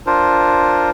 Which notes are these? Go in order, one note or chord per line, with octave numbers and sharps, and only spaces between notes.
D4 F4 A#4 C5